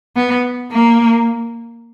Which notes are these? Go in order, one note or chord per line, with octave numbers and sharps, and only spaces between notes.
B3
A#3